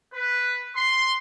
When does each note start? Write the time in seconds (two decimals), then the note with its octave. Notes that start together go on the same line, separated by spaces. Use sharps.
0.14 B4
0.76 C6